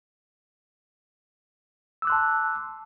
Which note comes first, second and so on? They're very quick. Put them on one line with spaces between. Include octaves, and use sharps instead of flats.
E6 D6 F#6 C6 A5